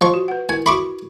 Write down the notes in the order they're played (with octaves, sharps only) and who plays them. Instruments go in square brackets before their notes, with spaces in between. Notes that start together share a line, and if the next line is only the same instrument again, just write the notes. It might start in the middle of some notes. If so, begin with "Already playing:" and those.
[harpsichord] F3 C#6 [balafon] D#5
[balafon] F#4
B4 F#5
[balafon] E4 A#4 [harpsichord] G#5
[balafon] F#4 E5 [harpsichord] B5 C#6 D6